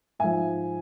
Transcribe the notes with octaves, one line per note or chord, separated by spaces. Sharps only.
G#2 F3 E5 G#5